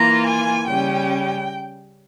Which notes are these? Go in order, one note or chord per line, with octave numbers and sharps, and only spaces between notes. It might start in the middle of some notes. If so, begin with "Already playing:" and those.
Already playing: E3 A#3 F4 A#5
G#5
C#3 G3 C#4 G5